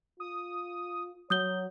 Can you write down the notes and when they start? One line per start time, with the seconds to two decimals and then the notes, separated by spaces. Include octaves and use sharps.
0.20 F4 D#6
1.30 F#3 C#5 D#6 G6 G7